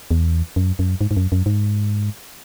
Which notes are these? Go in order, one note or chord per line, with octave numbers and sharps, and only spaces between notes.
E2
F#2
F#2
G#2
G#2
F#2
F#2
G#2